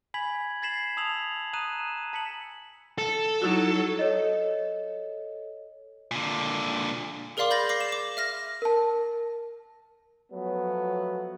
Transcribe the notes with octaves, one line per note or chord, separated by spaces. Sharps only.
G#5 B5 G#6 B6 F#7
G#6 A6 B6 C7 E7 F#7
A5 D#6 E6 F7 F#7
A#5 D#6 F#6 D#7 E7
A5 B6 C#7 F#7
A4
F#3 D#4 E4 F#4
A4 C#5 D#5
A#2 D3
G#4 A#4 D5 F5 C6 D6
B5 G6 A6 A#6
D6 A#6 C7
E7
D6
E5 F6 A#6
A#4 A5
F3 F#3 A3 B3